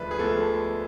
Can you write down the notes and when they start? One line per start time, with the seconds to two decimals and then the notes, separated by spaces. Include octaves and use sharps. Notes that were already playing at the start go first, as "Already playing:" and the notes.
Already playing: D2 D3 F3 G#3 B4 E5
0.11 G#4
0.19 D2 D3 F3 G#3 A4